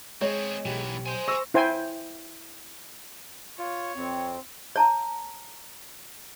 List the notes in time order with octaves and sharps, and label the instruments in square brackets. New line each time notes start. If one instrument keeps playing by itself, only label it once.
[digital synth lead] G#3 [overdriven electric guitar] C4 G#4 [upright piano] C#5
[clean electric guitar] B1 G4 [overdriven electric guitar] G#2 E3
[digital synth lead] C5 [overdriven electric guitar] G#5 C6
[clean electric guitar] C5 [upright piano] C#6 E6 [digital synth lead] A#6
[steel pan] E4 C5 G5 G#5
[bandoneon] F4 [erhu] C#5
[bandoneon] F2 [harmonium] C4
[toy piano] C#5 A5 A#5